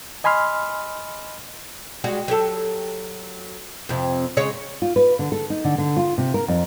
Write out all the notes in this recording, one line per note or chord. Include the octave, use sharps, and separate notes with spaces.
D#5 G#5 B5 C6 F6
G3 G#3 F#4
F#3 G4 A4
F2 C3
C#3 G#3 C#5
F4
B4
D3
A4
D#4
D3
D3
F4
C3
A#4
F2